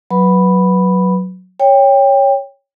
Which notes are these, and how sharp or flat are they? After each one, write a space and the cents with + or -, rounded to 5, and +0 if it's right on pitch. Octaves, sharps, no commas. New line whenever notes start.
F#3 -5 B4 +0 B5 +0
C#5 +0 G5 +20